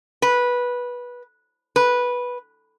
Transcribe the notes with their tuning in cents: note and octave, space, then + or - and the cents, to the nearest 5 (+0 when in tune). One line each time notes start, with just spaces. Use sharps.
B4 -15
B4 -10